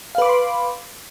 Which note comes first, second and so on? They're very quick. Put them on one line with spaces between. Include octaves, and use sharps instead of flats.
F5 B4 D6 B5 C6